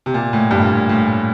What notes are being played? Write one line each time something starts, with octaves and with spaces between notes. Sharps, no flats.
C3
A#2
A2
G2
A#2
A2
A2
A2